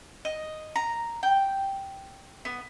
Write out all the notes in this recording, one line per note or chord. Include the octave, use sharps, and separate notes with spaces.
D#5
A#5
G5
B3